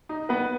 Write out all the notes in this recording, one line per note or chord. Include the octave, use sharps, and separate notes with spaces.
D#4
B3 B4